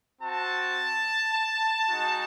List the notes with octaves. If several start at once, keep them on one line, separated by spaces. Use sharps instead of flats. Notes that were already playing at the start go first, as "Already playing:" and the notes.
C4 F#4 A5
G#3 D#4 F#4